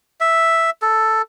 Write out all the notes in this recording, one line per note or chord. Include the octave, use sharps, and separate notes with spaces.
E5
A4